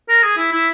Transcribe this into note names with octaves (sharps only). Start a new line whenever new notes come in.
A#4
G#4
E4
E4